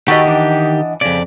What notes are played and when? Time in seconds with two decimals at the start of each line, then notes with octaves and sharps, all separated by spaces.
0.08 D#3 F#4 G4 A4 B4 D#5 F#5
0.26 E3 D4
1.01 F2 C#3 D5